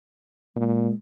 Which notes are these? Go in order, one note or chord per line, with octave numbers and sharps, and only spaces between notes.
A#2 G#3